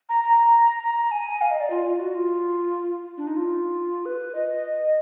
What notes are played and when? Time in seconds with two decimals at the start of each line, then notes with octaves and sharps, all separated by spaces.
0.09 A#5
0.24 A#5
0.83 A#5
1.11 G#5
1.41 F5
1.51 D#5
1.60 D5
1.70 F4
1.85 F4
1.99 F#4
2.14 F4
3.18 D4
3.27 D#4
3.37 F4
4.05 B4
4.35 D#5